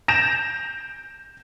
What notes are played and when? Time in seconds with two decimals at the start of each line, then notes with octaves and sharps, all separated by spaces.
0.08 G6 A#6 D7 E7 F7